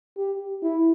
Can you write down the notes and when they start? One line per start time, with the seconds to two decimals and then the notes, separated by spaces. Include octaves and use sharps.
0.17 G4
0.63 E4